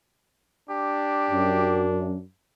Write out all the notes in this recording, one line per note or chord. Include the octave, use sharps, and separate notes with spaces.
D4 G4
F#2